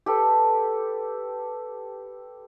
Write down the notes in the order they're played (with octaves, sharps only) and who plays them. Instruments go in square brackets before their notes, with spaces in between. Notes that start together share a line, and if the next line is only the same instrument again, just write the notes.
[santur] G4 A4 B4